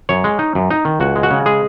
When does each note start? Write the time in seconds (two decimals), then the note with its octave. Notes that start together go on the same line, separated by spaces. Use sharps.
0.09 F#2 C#5
0.24 G#3
0.39 D#4
0.55 F#2
0.70 D#4
0.85 D#3
1.00 C#2 F#4
1.16 G#3
1.23 F#4
1.31 C#3
1.46 G#3 G#4